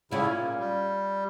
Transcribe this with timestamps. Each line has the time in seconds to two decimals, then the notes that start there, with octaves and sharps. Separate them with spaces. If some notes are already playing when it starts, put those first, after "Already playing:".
0.11 A2 C#3 C#4 E4 F4 D5
0.33 A#2
0.60 G3